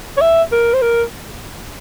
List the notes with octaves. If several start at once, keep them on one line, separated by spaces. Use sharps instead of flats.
C#5
E5
A#4
C5
A#4